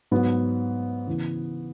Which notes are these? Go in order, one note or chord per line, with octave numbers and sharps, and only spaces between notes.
G#2 F#3 B3
C#3 E3 B3